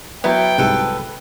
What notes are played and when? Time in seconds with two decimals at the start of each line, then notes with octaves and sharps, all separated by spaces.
0.24 F#3 B3 E4 G5
0.58 C2 G#2 C3 A4 B4